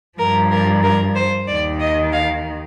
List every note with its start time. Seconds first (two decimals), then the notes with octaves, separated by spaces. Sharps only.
0.18 G2 F3 A#4
0.51 A#4
0.83 A#4
1.15 C5
1.47 D#2 D#3 D5
1.80 D#5
2.13 F5